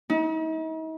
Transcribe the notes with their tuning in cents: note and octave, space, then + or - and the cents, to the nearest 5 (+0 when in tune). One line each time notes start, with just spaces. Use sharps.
D#4 +45